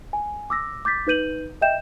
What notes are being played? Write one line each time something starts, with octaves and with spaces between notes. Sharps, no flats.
G#5
D6 E6 A#6
D6 G6 A6 B6
D#4 B4 G6 D#7 F#7
D#5 E5 G5 G6 E7